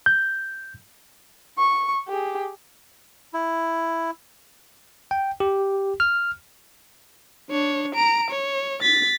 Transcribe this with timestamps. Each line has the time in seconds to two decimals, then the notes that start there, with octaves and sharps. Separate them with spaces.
0.06 G6
1.58 C#6
2.08 G4 G#4
3.34 E4
5.11 G5
5.40 G4
6.00 F6
7.50 D4 C#5
7.95 A#5 D7
8.30 C#5
8.83 A6 B6